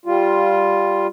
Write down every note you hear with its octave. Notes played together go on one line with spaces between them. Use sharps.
G3 F4